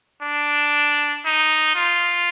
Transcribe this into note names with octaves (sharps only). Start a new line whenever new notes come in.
D4
D#4
F4